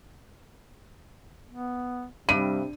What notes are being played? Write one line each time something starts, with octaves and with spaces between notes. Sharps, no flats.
B3
G2 C3 G3 D#7